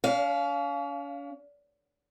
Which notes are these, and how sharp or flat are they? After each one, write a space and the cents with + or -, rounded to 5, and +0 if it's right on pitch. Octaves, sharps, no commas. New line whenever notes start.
C#4 +40 F5 +0